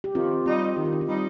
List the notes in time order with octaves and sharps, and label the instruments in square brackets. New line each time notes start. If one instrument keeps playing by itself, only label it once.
[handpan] G4
[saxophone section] D#3 [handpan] C4 F4
[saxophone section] G3 D#4 [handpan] C4 F4
[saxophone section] D#3 [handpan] G4
[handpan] F4
D#4
C4 F4
[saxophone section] G3 D#4